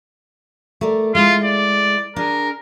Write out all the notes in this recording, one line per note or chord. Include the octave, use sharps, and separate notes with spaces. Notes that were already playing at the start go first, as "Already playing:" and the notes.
A3 A#4 D5
G#3 E4 F4
D5
D4 G#4 A#4